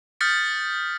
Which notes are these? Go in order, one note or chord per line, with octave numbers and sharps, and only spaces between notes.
D#6 F6 G6 A6 B6 C#7